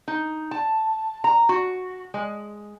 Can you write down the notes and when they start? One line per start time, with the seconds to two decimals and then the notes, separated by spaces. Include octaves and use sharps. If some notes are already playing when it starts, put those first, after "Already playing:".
0.08 D#4
0.51 A5
1.24 A#5
1.49 F#4
2.14 G#3